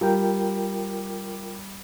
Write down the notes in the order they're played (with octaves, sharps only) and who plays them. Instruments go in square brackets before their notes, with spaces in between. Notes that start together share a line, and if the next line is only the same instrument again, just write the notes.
[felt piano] G3 [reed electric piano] F4 A#4 G5